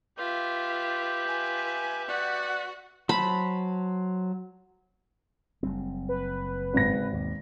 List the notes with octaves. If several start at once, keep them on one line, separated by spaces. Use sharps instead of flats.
F4 G4 B4 E5
F4 G#5
F#4 D5 F#5
F#3 C5 A5 B5
F#1 G3 C4
B4
G#1 A#6
G#2 C#3
D#2 B2